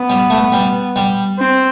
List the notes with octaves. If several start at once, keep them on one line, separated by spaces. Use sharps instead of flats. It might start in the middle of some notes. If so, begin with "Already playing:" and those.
Already playing: B3
G3
A3
G3
G3
C4